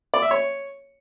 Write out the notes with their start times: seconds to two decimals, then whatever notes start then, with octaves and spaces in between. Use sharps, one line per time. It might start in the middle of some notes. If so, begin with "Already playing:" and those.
0.14 D5
0.22 E5
0.31 C#5